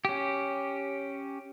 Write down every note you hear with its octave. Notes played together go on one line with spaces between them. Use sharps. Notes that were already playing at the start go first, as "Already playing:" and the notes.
C#4 G4